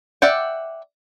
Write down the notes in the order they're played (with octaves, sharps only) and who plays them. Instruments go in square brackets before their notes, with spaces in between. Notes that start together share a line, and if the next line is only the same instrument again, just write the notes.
[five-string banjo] D5 E5 F#5 G5